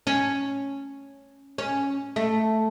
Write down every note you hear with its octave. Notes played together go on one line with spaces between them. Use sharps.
C#4
C#4
A3